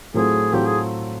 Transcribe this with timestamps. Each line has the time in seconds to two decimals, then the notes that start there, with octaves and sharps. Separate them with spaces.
0.14 A2 F#3 A3 C4 F4 G#4
0.53 A2 F#3 A3 C4 F4 G4
0.66 G#4